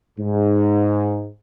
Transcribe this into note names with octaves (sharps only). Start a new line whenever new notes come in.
G#2